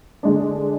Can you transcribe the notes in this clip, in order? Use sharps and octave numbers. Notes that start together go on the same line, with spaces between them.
D3 G#3 D4